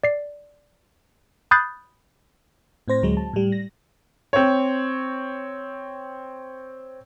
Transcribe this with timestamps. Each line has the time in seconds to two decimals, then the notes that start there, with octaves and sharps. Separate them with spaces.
0.04 D5 C7
1.51 B5 D#6 F#6 G6 A6 C7
2.88 A2 C4 C5 A#6
3.02 D2 F#3 G#3
3.17 A5
3.33 A2 G3
3.52 A#6
4.33 C4 C#5